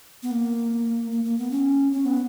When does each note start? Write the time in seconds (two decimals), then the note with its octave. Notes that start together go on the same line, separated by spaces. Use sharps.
0.23 B3
0.31 A#3
1.12 A#3
1.24 A#3
1.39 B3
1.51 C#4
1.92 C#4
2.05 B3